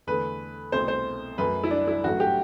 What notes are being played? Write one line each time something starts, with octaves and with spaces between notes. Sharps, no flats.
E2 D3 A3 B4
C2 B2 A3 C5
C5
F#2 F#3 A3 B4
E4
D4
E4
A1 G2 F#3 A3 F#4
G4